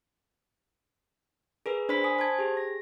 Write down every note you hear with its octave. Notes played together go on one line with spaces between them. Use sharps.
G#4 A#4 B4
D4 C5 B5 B6
G#5 D#6
C5 A5 G#6
G4 G#4
A#6